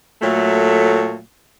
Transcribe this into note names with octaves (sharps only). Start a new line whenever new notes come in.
A#2 F#3 A3